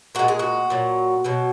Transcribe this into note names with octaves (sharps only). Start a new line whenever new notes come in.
A#2 G#3 F#4
G#4
F#4
A#2 F#3
B2 F#3